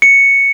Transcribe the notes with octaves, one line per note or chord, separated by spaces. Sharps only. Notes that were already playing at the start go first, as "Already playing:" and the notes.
C#7